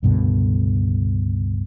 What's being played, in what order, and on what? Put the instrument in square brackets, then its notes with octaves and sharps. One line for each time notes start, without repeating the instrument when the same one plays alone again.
[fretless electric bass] C#2 G2 B2 D3